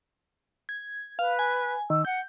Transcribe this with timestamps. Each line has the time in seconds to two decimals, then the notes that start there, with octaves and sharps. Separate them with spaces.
0.69 G#6
1.19 B4 F5
1.39 G#5
1.90 D#3 E6
2.05 F#5 G6